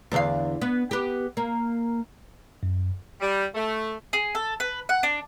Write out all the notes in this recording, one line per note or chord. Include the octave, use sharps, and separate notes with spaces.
E2 D3 F5
B3
B3 G4
A#3
F#2
G3
A3
G#4
A4
B4
F#5
D4